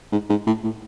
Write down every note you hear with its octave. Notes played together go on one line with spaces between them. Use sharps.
G#2
G#2
A2
A2